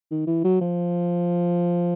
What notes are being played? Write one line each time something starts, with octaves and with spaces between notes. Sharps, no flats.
D#3
E3
F#3
F3